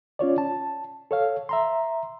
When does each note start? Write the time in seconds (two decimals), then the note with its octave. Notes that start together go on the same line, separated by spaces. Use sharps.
0.19 C#4 F4 C#5 D5
0.38 A5
1.11 A4 C#5 F5
1.49 E5 A#5 C6